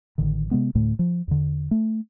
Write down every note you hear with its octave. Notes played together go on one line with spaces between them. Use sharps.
A1 D3 D#3
C3 G#3 B3
D2 A2 A3
F3
E2 D3
A3